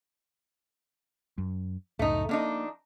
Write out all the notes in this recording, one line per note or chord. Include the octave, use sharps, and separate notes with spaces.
F#2
C#2 F#2 A2 A3 D#4
F2 A#3 D4 D#4